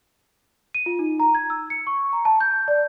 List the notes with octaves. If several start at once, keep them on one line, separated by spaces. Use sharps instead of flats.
D#7
F4
D#4
A#5
G#6
E6
C#7
C#6
A#5
A5
G6
D5